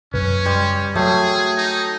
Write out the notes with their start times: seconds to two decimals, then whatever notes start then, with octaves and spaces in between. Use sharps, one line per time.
0.14 F#2 C#3 C#4 B4
0.46 G3 C6
0.95 F#3 A3 F#4 G#4 C#5 G5
1.57 D#4